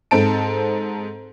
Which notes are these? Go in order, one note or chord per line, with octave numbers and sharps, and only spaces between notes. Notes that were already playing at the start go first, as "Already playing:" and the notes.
G#2 C4 A4 A5 D7